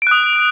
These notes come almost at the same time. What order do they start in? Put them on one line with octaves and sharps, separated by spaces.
D7 F#6 D#6